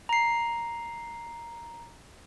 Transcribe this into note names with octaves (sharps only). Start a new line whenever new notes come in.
A#5 C7